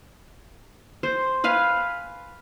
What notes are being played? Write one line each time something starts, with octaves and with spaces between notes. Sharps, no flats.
C5
B4 F5 G#5